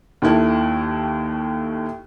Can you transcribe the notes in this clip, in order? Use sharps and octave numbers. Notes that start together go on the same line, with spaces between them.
D#2 D#3 E4 A4